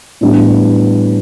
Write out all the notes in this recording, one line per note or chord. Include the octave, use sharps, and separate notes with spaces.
A2 E3 G3 B3 D4